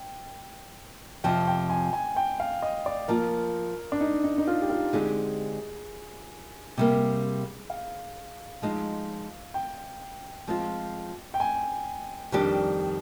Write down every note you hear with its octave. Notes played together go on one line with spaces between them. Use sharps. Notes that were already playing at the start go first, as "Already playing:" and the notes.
Already playing: G5
F2 C3 F3 G5
G5
G#5
G#5
G5
F5
D#5
D5
F3 A#3 F4 A#4
D4
D#4
D#4
D#4
F4
G4
F4
D3 G#3 C4 D#4 G4 G#4
C3 G3 A#3
F5
F3 G#3 D#4
G5
F3 G#3 C4 F4
G5
G#5
F2 D#3 G3 D4 G4